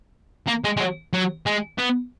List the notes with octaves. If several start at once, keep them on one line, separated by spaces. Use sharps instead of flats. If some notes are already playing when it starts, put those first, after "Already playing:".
A#3
G#3
G#3
F#3
F#3
G#3
B3